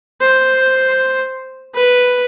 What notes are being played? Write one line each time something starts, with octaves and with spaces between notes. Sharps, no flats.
C5
B4